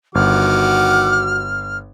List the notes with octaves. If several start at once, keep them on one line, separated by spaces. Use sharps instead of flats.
G1 D#3 F#4 F#5 D6 F6